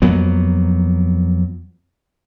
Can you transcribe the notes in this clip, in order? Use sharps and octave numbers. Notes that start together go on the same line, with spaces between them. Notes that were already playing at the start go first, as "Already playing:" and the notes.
F2 F#3 A#3 B3